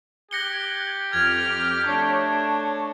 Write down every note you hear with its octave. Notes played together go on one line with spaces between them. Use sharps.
G4 F#6 G#6 A#6 C#7 G7
F2 F6 G#6
A3 D4 C#5